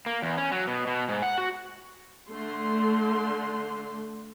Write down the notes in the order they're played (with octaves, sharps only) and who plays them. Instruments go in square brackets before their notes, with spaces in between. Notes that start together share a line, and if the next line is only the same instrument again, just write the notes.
[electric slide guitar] A#3
E2
C#4
F#3
B2
B2
G#2
F#5
F#4
[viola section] D3 A3 C6